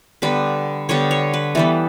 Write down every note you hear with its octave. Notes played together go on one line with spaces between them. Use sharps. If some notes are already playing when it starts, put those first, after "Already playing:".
D3 G3 B3 B4
D3 G3 B3 C#5
C#5
B4
E3 G3 B3 A4